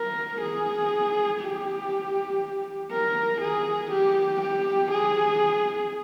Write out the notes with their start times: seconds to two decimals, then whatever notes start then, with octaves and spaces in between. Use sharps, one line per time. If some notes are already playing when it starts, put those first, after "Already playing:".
Already playing: A#4
0.41 G#4
1.41 G4
2.91 A#4
3.41 G#4
3.92 G4
4.42 G4
4.92 G#4